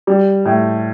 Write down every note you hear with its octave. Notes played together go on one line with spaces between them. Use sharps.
G3
A2